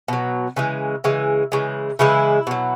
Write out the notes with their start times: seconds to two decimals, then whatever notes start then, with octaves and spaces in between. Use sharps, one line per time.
0.08 B2 F#3
0.56 C#3 E3 G#3
1.04 C#3 E3 G#3
1.52 C#3 E3 G#3
1.99 C#3 E3 G#3 E4
2.47 B2 F#3